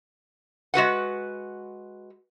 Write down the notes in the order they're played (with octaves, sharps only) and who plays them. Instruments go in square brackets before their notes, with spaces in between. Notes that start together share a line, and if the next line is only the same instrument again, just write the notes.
[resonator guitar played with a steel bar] G#3 F#4 B4 F#5